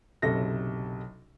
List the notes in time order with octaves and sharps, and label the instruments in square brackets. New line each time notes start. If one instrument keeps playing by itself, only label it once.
[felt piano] F#1 B1 C3 A4 A#6